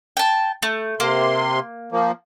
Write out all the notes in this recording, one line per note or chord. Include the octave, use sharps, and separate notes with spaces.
G5 A5
A3
C3 A#3 C6
F3 A#3